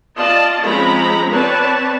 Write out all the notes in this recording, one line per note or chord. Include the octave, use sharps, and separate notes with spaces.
F4 D5 D#5 A5
F3 G#3 C4 C#4 A#5 B5
C4 B4 C#5 D5 A5